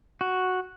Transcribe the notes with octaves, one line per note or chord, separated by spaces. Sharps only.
F#4